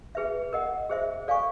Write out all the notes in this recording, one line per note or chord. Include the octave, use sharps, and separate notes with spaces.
G#4 B4 E5
A#4 D#5 F#5
G#4 C5 E5
A4 D5 F5 G#5 C#6